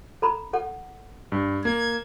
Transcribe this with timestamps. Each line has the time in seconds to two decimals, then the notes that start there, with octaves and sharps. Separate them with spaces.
0.22 A4 A#5 B5
0.53 A4 F#5
1.32 G2
1.65 A#3 G#6